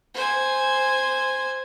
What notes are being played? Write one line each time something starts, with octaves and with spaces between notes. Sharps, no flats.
C5 G#5